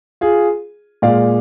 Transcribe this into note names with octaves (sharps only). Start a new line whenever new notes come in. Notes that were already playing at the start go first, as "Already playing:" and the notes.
F4 G#4
A#2 G#3 D5 F5